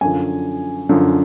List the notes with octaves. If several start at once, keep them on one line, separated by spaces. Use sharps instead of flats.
F#2 D3 F3 G#5
F#2 D3 F3